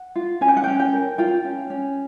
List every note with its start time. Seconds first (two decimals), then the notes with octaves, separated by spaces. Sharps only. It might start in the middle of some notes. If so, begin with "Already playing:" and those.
Already playing: F#5
0.16 F4
0.41 C#4 G#5
0.48 G5
0.57 F#5
0.64 C#4 G5
0.80 G5
0.93 A#4
1.18 F4 G5
1.44 C#4
1.70 C#4